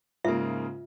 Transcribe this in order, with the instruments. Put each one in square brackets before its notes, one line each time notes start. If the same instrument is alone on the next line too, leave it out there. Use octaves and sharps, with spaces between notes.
[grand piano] G#2 C#3 A#3 [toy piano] F4 E5